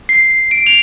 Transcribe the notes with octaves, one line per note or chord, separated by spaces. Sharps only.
C7
D7
F7